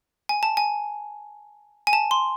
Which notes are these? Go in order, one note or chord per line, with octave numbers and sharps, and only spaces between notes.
G#5
A5
G#5
G#5
A5
C6